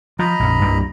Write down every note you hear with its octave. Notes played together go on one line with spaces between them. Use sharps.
F3 D#5 A#5 B5
A#1 F2
C2 G2 G3